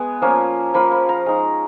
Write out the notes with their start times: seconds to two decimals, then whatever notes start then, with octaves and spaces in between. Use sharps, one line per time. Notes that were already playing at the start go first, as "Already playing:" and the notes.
Already playing: G#3 B3 G#4 G#5
0.22 F3 A#3 C#4 F4
0.74 F3 A#3 F4 B5
0.92 B5
1.09 A#5
1.26 G#3 D#4